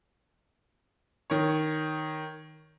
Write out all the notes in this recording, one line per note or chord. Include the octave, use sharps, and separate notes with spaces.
D#3 C#5